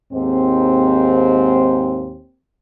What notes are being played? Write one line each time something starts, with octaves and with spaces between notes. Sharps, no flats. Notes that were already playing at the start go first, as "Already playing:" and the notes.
D#2 G#2 C4